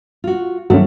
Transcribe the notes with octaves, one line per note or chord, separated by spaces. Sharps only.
F4 F#4
G2 D#3 F#3 A3 C#4 F#4